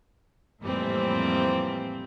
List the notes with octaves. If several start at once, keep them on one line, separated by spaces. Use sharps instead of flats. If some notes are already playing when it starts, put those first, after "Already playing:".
F2 A2 E3 G3 A#3 C4